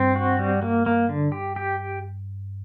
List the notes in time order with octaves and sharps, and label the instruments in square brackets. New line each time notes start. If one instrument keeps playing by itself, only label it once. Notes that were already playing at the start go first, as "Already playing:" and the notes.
Already playing: [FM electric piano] G2 [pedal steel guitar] C4
[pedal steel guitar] F#4
G3
A#3
A#3
D3
G4
G4